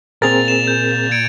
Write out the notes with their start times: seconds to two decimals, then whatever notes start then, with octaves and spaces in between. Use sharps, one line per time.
0.22 A#2 C4 G#4 A#4 A6 F7
0.48 E7
0.67 G6
1.11 G#6 C#7 D7